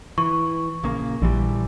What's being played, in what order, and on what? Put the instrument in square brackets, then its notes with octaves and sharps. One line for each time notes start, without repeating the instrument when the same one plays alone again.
[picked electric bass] E3 [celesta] C#6
[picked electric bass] A#1 C#3 A#3
[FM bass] A#1 [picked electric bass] D3 E3 G3